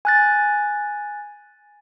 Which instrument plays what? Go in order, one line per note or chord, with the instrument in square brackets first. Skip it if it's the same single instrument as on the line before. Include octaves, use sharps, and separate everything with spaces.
[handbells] G#5 F#6 A6